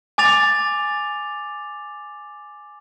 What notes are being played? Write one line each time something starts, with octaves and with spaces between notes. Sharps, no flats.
G#5 D6 A6 F7